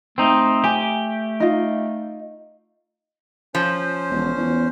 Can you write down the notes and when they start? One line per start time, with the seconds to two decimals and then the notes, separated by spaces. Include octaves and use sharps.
0.18 A3 C4 D#4
0.64 G4 G#5
1.40 D#4 F4
3.55 F3 C#4 C5
4.10 E1
4.37 E2